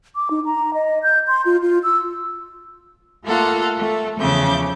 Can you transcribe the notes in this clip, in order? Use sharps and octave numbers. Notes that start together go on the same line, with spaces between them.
D6
D#4
A#5
D#5
G6
C6
F4
F4
E6
A3 A#3 F4 A4 F5 F#5
A3 A4
E2 C#3 F3 E5 D6 G6